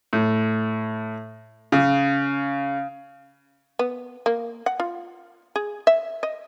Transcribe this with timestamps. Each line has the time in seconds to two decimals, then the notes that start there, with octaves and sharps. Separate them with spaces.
0.13 A2
1.72 C#3
3.79 B3
4.26 A#3
4.66 F#5
4.80 F4
5.56 G#4
5.87 E5
6.23 D#5